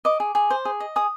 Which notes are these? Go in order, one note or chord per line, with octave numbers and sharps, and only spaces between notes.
D#5 D6
G#4
G#4
C5
G#4
D#5
G#4 D#6